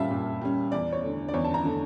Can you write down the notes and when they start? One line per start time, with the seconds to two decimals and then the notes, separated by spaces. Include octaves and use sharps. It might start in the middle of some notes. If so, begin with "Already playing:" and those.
Already playing: A#2 G3 C#4 E5 F5 A5
0.11 A#2
0.42 G3 C#4
0.72 E2 D5
0.92 C#5
1.02 D3 A3
1.28 D5
1.34 E2 C#5
1.45 A5
1.54 A#5
1.64 D3 A3